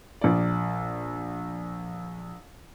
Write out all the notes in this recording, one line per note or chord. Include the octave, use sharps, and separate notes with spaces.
A#1 D5